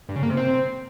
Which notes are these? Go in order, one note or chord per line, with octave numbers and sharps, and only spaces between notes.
G2
C#3
A#3
C3
C4